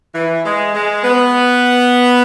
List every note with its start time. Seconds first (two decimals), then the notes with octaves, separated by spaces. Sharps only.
0.15 E3
0.45 G#3
0.75 G#3
1.04 B3